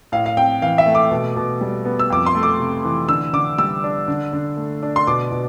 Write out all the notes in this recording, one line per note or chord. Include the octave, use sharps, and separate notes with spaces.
A2 F5
F5
C4 G5
E3 F5
E5
A3
D6
B2
B2
G3
B3
E6
F2 D6
C6
A3
D6
C3
E3
D3 E6
D3 D6
G3 E6
D4
D3
D3
A3
D4
C6
B2 D6
B2